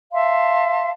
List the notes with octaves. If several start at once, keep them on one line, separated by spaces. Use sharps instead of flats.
E5 F5 A5 C6